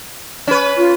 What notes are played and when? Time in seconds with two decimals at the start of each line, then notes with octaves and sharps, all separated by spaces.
0.47 C#4 B4
0.77 F4